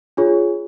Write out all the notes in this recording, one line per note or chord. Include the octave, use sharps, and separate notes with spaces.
D4 F4 G#4 C#5